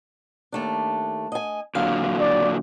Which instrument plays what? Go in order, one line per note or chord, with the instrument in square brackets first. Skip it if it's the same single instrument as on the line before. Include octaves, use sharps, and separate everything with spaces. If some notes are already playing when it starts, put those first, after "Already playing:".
[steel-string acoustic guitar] D#2 A3 D4
D#5 G#5
[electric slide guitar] A#2 D3 F#3 [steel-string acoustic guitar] F5
[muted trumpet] D5